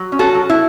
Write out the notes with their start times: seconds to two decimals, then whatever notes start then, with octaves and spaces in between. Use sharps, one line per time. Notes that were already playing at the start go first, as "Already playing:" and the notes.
Already playing: F#3
0.12 C#4
0.19 F#4 A4
0.35 F#3
0.50 E4